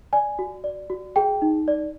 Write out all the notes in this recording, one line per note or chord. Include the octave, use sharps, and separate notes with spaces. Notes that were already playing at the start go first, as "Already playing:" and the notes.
D5 G#5
F#4
D5
F#4
G#4 G5
D#4
D5